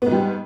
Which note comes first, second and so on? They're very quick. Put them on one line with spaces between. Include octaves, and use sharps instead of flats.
B3 G#2 G3